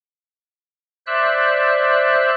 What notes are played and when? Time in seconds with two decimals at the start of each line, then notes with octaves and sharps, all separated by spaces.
1.07 C5 D5 E5 E6 F#6